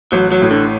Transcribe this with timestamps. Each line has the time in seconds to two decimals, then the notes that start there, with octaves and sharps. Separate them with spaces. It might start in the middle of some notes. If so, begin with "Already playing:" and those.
0.12 A1 F#3
0.32 F#3
0.42 A2
0.51 D3